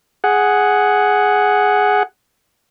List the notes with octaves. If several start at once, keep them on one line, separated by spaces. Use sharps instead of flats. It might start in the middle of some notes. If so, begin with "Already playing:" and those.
G#4 F#5